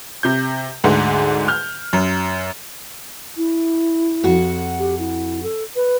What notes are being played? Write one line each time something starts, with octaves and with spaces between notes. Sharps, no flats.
C3 G6
D2 G#2 D3
F6 G6
F#2
E4
F2 F#4 F#5
G4
E4
A4
B4